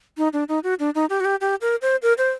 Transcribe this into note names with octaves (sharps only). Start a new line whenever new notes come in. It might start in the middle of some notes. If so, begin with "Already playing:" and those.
D#4
D4
D#4
F#4
D4
D#4
G4
F#4
G4
G4
A#4
C5
A#4
C5